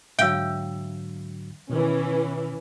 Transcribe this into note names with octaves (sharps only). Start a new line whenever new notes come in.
G#2 D3 F#3 E5 F5 G5 E6
B2 D#3 E3 C#4